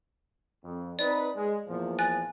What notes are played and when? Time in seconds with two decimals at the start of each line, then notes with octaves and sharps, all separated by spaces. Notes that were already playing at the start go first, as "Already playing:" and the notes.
0.64 F2
0.99 C4 D#4 B4 D5
1.35 G#3
1.66 E2 A#2 F3
1.99 G#5 F#6 A6